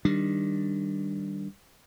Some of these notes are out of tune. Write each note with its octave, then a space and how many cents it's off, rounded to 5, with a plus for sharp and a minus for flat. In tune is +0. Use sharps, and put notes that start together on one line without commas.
D#3 +0 G3 +0 D4 +0